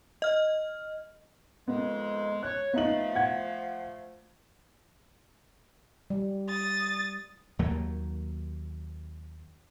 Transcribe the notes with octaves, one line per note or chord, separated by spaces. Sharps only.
D#5 F6
F2 D#3 G#3 B3
C#5 F#6
F3 A3 B3 D#4 F#7
F#5 G#6
G3
D#6 A6
D#2 F#3 A3 A#3